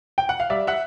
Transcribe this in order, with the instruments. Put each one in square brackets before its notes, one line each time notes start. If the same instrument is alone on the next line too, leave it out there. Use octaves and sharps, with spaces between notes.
[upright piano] G5
F#5
F5
G3 D5 E5
E5 F#5